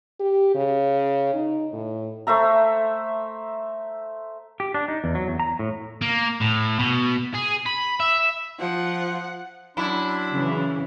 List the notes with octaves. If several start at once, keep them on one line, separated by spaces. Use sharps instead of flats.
G4
C#3
D#4
A2
A3 C5 E5 A#5
G4
D4
D#4
E2
F#3
E2
A#5
A2
A#3
A2
B2
G#4
B5
E5
F3 F#5
F#2 D4 E4 B5
C#3 E3